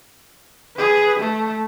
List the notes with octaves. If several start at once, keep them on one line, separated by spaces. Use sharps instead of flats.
G#4 B4
A3